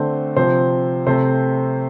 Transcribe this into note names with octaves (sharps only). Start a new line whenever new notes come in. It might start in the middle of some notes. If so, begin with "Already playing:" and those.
Already playing: D3 A3 C4 C5
C3 F3 C4 C5
C3 A3 C4 C5